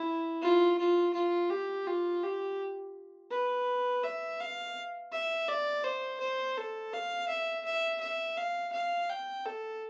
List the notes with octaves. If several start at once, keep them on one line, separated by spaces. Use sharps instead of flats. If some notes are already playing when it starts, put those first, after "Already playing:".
Already playing: E4
F4
F4
F4
G4
F4
G4
B4
E5
F5
E5
D5
C5
C5
A4
F5
E5
E5
E5
F5
F5
G5
A4